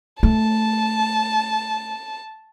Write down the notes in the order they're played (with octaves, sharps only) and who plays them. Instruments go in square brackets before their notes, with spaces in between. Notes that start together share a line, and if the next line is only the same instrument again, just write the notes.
[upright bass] A3 [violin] A5